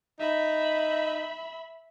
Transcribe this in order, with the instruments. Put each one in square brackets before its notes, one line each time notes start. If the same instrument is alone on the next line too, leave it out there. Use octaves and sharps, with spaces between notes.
[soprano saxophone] D#4 [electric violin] E5 B5